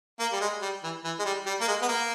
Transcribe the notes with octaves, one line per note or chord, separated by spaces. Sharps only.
A#3
G3
G#3
G3
E3
E3
G#3
G3
G3
A#3
G#3
B3
A#3